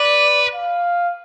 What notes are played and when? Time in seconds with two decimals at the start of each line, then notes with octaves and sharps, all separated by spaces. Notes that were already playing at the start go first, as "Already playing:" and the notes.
Already playing: B4 D5
0.55 F5